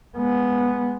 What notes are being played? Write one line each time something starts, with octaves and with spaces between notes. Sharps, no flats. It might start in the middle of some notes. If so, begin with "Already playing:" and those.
G#3 B3